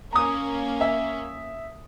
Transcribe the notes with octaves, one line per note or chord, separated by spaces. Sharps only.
A#3 C#4 A#5 D#6
E5